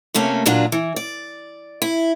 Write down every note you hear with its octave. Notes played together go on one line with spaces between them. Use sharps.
C3 A3 A#3 C#4
A#2 F#3 D4 F4
E3
D5
E4